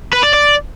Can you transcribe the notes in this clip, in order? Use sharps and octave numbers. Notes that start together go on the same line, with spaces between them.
B4
D5
D5